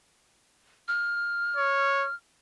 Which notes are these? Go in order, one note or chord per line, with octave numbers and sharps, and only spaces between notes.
F6
C#5